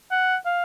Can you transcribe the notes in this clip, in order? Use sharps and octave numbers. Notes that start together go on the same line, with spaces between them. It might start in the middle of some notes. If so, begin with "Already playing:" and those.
F#5
F5